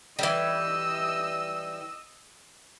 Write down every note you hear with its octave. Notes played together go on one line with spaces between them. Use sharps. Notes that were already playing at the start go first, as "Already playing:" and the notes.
E3 G3 D#5 E6